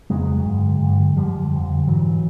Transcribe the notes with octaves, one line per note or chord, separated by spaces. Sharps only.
F2 C#3 F#3 G#3
G2 D3
G2 D3
F#2 D3 F3 G3
F2 D3
G#2 E3 F#3